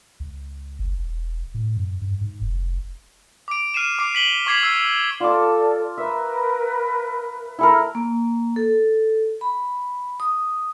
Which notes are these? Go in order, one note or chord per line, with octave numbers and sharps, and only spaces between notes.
C#2
F#1
E1
A2
F#2
G2
G#2
F1
D6 D7
F6 C7 D#7 E7
D6 C7
B6 F#7 G7
C#6 D6 G#6 B6 C7 F#7
E6 C7
F4 A4 D5 D6
A#4 B4 E5
E4 A4 A#4
A#3
A4
B5
D#6